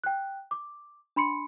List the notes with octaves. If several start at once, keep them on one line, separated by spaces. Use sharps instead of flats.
G5 F#6
D6
D4 B5 C6 C#7